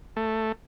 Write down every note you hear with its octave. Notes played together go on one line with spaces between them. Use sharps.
A3